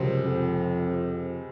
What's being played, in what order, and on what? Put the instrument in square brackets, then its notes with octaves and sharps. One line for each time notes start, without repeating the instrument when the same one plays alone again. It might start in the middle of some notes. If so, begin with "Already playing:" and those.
Already playing: [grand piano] C#2 C3 F3 C4 [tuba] F#2
[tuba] F2